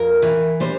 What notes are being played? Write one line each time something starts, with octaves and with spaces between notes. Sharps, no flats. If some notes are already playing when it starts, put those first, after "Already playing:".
Already playing: F2 A#4
E3
G3 C5